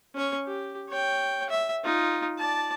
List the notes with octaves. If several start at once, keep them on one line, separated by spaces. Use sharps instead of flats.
C#4 C#5
G4
C#5 G5
E5
D#4 F4
D5 A5